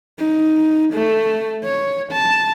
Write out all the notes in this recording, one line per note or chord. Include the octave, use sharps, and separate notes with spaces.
D#4
A3
C#5
A5